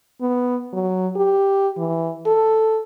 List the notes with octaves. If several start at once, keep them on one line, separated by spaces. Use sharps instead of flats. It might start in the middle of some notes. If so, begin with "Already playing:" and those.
B3
F#3
G4
E3
A4